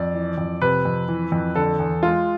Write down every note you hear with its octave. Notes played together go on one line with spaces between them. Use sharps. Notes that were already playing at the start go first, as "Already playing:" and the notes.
Already playing: F2 D5
E3
F2
C3 B4
F2
E3
F2
D3 A4
E2
G#3 F4